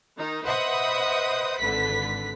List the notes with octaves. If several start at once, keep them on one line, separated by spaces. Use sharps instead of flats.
D#3 D#4
B4 C5 D#5 E5 F#5 D#6
G#1 D3 B4 B6